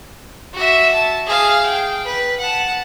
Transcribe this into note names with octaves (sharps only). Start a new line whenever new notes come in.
F#4 E5
A5
G#4 F5
G5
B4
F#5 A5